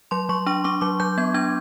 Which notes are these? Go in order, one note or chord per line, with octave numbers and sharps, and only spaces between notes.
F#3 C6
F#3 C#6
D4 C#6
D4 D6
F#3 D6
F#3 G6
B3 G#6
D4 G#6